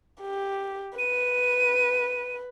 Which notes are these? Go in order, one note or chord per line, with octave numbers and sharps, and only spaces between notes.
G4
B4 D#7